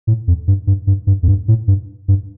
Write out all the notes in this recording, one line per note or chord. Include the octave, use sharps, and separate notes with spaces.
A2
F2
G2
G2
G2
G2
F2
G2
A2
G2
G2